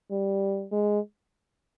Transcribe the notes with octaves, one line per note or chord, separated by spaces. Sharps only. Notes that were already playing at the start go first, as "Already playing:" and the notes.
G3
G#3